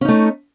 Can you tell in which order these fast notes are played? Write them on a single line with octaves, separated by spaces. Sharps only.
C#4 D#4 A3